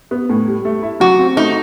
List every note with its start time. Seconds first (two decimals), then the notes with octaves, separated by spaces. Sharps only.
0.11 B3
0.29 A2
0.47 G3
0.65 A3
0.83 E4
1.00 F#3 F#4
1.19 C4
1.36 A3 D#4